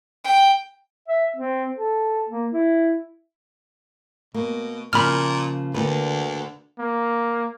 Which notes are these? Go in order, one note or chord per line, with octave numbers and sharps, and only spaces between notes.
G5
E5
C4
A4
A#3
E4
B2 A#3
A#2 C#3 F3 A#3 B5 F6
D2 D3 A#3 B4
A#3